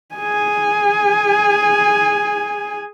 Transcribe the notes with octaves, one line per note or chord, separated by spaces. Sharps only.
G#4 G#5